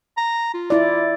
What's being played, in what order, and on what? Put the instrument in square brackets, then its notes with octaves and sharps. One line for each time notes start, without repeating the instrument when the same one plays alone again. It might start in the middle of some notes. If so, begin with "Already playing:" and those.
[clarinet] A#5
F4
[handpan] E4 D5